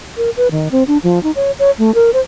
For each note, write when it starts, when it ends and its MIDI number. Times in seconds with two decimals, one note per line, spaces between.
0.17 0.30 70
0.37 0.51 71
0.51 0.68 51
0.71 0.84 60
0.88 0.98 62
1.03 1.22 53
1.23 1.31 63
1.36 1.51 73
1.59 1.71 73
1.79 1.94 57
1.95 2.11 70
2.13 2.21 72